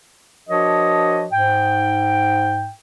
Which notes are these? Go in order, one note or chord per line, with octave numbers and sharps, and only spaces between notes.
F3 D4 F#4 A#4 C#5 D#5
G#2 G5